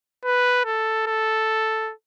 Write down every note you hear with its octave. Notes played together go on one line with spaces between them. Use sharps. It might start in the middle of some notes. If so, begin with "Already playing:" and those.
B4
A4
A4